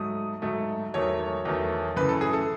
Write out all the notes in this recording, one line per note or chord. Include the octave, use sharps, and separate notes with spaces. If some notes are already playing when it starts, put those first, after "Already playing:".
Already playing: G#2 F#3 A3 D#6
G#2 F#3 A3
E2 D#3 F#3 A3 C#5
E2 D#3 F#3 A3
F#2 C#3 E3 A3 B4
A4
G#4
A4